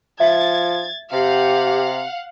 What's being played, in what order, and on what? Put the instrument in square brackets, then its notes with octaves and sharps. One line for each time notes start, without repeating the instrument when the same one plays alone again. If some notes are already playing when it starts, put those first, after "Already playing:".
[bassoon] F3 [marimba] E5 [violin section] G#6 A6
[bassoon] C3 [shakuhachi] G4 [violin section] F5 F#5